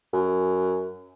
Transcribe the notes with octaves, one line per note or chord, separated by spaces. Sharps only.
F#2